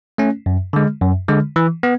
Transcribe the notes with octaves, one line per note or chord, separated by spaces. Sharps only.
A3 C#4
F#2
D3 G#3
F#2
D3 G#3
E3
B3